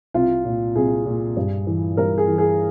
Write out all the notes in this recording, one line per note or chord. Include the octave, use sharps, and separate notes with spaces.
C2 F4
A#2
C2 G#4
A#2
G2
E3
G2 A#4
G#4
E3
G#4